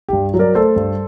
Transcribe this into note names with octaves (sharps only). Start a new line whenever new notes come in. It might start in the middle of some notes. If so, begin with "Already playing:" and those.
G2 G4
F#3
A#4 D5
A3 A4 C5
G2